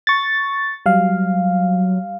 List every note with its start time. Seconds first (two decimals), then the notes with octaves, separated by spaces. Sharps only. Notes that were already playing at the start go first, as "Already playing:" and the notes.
0.07 C#6 A6
0.86 F#3 G3 F5